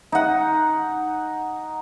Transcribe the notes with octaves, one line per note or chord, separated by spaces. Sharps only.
D#4 F#5